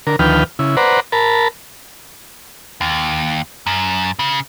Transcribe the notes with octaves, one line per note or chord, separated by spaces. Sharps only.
D3 A#4
D2 D#3 F3 B4 G5 F6
C#3 E4
B4 C5 D5 F#5 A#5
A#4 A5 B5
D#2
F#2
C#3